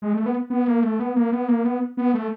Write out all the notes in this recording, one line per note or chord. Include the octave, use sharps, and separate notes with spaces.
G#3
A3
B3
B3
A#3
A3
B3
A#3
B3
A#3
B3
B3
A3